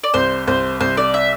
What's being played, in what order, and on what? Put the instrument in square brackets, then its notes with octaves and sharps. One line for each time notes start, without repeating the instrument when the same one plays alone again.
[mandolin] D5
[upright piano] C2 [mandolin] C5
[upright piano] C2 [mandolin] C5
[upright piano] C2 [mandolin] C5
[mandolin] D5
E5